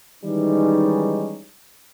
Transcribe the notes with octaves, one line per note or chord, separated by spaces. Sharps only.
D#3 E3 G3 G#3 C#4 D#4